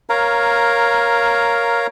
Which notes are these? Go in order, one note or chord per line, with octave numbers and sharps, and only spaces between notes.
A#4 C#5 F5 A#5